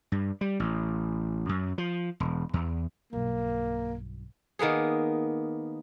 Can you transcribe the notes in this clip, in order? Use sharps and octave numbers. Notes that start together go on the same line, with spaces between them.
G2
G3
A1
F#2
F3
E1
E2
B1 G2 A#3
D#3 A#3 B3 G#4